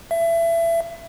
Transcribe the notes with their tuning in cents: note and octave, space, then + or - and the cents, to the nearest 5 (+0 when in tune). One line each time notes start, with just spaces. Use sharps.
E5 +25